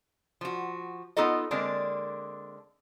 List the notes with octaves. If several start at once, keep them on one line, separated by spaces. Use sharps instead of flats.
F3 F#4
B3 D#4 F4 A4 D#5
D3 G#3 A#3 C4 D4